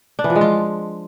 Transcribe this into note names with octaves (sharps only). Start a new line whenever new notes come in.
D4
E3
F3
G#3
F4